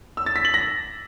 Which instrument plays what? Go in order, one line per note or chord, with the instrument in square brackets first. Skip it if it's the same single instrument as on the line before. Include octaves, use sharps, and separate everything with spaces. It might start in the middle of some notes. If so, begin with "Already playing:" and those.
[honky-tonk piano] E6
A6
B6
F#7
A#6